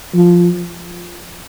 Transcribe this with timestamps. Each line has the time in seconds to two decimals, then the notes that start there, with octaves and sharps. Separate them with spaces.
0.15 F3